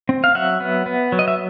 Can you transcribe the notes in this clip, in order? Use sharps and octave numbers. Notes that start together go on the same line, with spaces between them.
C4
F5
F#3 E5 F#5
B3
B3
F#3
D#5
E5